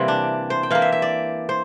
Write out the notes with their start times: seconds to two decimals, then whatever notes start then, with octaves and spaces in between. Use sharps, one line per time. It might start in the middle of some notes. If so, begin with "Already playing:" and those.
Already playing: C3 E3 G3 A#3 C4
0.08 D4
0.50 C5
0.63 G5
0.71 E3 A#3 F5
0.82 E5
0.92 E5
1.02 D5
1.49 C5